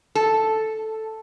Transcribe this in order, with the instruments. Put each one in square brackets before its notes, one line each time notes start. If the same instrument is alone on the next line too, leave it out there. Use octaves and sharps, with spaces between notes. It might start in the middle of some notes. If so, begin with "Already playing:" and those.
[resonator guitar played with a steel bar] A4